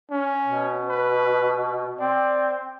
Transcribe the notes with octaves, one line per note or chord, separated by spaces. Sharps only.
C#4
B2
B4
C4 D5